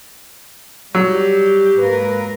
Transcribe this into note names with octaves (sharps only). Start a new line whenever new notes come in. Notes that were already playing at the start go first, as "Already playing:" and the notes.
F#3 G3 G4
G#2 A#3 A#4 B4